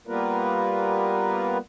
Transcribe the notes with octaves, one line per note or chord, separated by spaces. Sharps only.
G3 A#3 B3 F4 A#4 B4